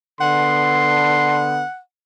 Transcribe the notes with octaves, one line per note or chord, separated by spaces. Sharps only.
D3 B3 F#5 C6